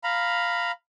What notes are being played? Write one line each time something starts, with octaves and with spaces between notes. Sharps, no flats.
F5 A#5 B5